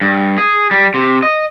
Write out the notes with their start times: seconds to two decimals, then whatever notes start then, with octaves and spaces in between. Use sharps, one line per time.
0.01 G2
0.38 G#4
0.71 G3
0.94 C3
1.23 D#5